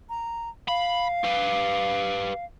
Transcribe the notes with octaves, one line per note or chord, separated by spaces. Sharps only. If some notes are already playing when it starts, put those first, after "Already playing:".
A#5
F5 B5
G4 B4